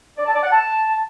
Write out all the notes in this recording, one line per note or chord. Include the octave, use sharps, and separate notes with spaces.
D5
A5
D5
F#5
A5